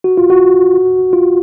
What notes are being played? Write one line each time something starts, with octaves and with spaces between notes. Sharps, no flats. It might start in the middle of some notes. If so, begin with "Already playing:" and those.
F#4
F4
F#4
F4